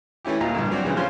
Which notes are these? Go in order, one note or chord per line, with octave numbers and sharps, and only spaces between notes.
E3 A3 C#4 E4 G4
D#2 A#2 F4 A#5
A#1 G2 D3
F#3 C4 D4 F#4
D2 C#3 E3 G3
C#3 F3 F4 C5 C#5 C6